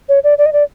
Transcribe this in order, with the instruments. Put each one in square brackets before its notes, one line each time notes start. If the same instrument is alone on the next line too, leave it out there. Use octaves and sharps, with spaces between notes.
[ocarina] C#5
D5
D5
D#5
D5